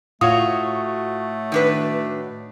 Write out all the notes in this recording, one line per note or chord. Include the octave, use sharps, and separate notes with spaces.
A2 A3 F4 F#4 C#5 D#6
D#3 D4 B4